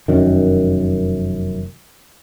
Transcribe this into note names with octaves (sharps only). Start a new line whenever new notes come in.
F1 F#2 D#3